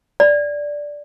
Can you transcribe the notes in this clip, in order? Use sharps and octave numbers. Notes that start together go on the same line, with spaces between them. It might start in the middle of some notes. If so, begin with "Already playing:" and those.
D5